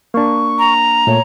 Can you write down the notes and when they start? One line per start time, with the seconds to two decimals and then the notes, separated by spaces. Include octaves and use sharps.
0.14 A#3 D4 C#6
0.59 A#5
1.07 A#2 A3 C#5